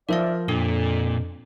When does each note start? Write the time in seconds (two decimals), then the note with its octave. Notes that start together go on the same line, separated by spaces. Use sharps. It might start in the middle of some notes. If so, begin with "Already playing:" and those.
0.09 F3 A#4 C5 D5 E5 F5
0.48 F2 A#2 D4 A4